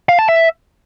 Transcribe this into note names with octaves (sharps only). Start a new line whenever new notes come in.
F5
A5
E5